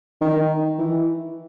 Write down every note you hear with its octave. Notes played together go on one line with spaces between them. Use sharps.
D#3
E3